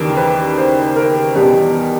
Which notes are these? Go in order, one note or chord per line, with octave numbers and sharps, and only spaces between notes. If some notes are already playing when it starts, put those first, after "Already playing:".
Already playing: D#2 C#3 E3 G3 A#4
B4
C5
A#4
E2 B2 G3